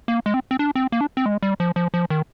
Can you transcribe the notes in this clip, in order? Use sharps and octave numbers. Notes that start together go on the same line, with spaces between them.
A#3
G#3
C4
C4
D4
C4
A#3
D4
C4
G#3
G3
F3
F3
F3
D#3